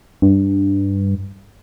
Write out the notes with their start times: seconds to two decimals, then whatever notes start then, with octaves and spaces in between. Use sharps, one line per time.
0.22 G2